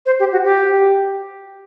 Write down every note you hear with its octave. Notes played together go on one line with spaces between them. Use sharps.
C5
G4
F#4
G4